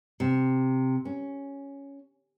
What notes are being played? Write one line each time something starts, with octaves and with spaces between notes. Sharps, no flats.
C3
C#4